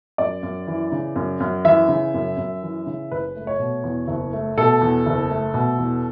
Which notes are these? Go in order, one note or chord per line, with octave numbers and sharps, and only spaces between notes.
F#2 D5
F#2
E3
C#3
F#2
F#2
E3 E5
C#3
F#2
F#2
E3
C#3
F#1 B4
A3
C#5
B2
E2
F#1
A3
B2 A4
E2
F#1
A3
B2
E2